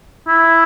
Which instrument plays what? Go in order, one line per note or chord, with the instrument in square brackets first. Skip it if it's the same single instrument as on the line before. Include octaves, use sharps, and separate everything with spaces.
[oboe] E4